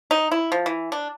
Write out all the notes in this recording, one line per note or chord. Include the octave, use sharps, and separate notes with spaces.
D#4
E4
F3
E3
D4